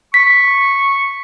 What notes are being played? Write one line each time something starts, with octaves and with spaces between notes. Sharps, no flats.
C#6 B6